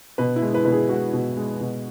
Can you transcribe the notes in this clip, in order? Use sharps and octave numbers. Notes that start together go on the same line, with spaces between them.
B2 B4
E4
G#3
B4
B2 B4
G#4
G#3 F#4
B2
G#3
B2